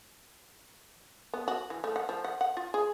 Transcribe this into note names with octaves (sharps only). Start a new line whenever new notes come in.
B3
F#4
E3
A3
F#5
F3
F#5
F#5
F4
G#4